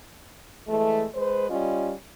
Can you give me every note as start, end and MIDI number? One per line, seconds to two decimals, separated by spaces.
0.68 1.05 52
0.68 1.05 56
0.68 1.05 57
1.15 1.48 56
1.15 1.48 71
1.15 1.48 72
1.49 1.92 55
1.49 1.92 61
1.49 1.92 65
1.49 1.92 75